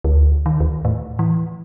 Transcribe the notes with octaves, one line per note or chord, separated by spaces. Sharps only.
D2
D#3
D#2
A2
E3